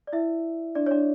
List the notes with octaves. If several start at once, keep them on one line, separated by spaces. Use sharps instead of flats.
D5
E4 E5
D4 D5
C#5
D4 D5